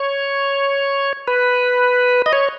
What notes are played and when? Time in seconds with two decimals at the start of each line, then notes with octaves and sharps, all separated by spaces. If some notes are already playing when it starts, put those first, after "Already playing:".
Already playing: C#5
1.28 B4
2.26 D#5
2.33 C#5